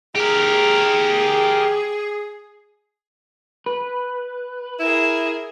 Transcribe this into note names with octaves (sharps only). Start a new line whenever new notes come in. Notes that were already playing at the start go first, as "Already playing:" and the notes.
G4 G#4 A#4
B4
E4 G#4 A#4 E7